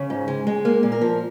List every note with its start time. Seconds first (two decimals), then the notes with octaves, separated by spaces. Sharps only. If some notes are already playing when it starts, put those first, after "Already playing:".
Already playing: C#3 C#4
0.10 G#2
0.28 G#3
0.47 G#3
0.65 A#3
0.83 A#2
0.92 A#4
1.01 F3